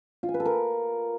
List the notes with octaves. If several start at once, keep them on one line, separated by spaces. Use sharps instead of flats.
F4
G#5
B4
A4
A#4